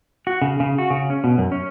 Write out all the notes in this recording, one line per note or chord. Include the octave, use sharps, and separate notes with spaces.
F#4
C#3
C#3
F#4
C#3
C#4
B2
F#2
C#4